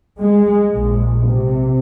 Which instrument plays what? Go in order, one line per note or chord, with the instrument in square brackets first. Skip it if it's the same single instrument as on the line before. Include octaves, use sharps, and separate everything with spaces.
[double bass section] G#3
A#1
C3